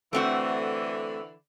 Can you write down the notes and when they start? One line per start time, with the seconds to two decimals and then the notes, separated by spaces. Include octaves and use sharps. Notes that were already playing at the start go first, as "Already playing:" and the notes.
0.13 D3 E3 A3 C4 F#4